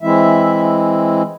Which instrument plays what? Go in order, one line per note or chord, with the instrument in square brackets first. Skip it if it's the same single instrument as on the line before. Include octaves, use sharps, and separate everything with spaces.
[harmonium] E3 G#3 C4 E4 E5